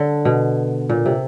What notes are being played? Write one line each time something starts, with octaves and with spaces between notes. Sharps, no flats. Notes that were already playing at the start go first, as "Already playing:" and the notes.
Already playing: D3
B2
A#2
C3